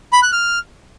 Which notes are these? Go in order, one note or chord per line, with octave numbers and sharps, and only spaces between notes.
B5
F#6
F6